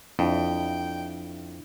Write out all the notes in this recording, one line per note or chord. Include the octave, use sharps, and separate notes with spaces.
F2 D4 E4 G5